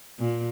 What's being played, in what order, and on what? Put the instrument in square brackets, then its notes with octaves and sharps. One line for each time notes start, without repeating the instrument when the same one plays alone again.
[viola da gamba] A#2